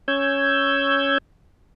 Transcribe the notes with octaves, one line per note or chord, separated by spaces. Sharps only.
C#4 C#5 E6 G6 G#6